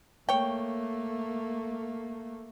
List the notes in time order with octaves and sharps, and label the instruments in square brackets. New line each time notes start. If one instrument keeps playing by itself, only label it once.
[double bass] A3 A#3 [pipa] C#5 G5